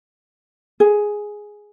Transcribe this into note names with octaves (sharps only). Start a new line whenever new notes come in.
G#4